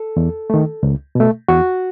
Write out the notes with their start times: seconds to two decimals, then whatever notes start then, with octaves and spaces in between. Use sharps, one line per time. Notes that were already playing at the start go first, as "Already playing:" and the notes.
Already playing: A4
0.17 E2
0.50 D#3 A3
0.83 C#2
1.15 B2 A3
1.48 E2 F#4